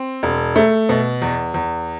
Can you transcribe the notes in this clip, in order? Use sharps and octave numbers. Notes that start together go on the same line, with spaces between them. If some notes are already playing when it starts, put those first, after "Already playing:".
Already playing: C4
E1
A3
B2
E2
E2